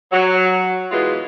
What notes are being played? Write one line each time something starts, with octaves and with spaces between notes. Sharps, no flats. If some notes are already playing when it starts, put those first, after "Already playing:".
F#3
B2 E3 G#3 B3 F4